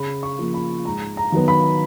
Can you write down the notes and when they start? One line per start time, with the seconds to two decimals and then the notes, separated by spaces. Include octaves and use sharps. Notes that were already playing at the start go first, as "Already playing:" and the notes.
Already playing: C#3 B5
0.23 C#6
0.39 F3 A#3
0.54 B5
0.85 G#2 A#5
1.17 A#5
1.32 D#3 F#3 B3
1.48 B5